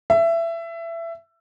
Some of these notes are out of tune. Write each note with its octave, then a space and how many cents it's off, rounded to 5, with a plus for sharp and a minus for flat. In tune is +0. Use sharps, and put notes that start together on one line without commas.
E5 +20